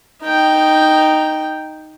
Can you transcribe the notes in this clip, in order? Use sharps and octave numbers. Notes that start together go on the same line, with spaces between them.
D#4 G5